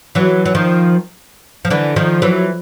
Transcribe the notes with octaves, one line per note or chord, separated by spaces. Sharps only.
E3 F#3
F#3
D#3 F3
F3
D3 E3
D#3 F3
E3 F#3